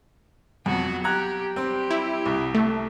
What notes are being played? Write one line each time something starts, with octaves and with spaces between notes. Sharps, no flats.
F2 F#3 B3 F#4
G4 A#5 F#6 G#6
G3 C4 G4
E4
C2
A3